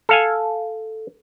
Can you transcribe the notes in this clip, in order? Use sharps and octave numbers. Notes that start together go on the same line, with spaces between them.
A4 F5 G#5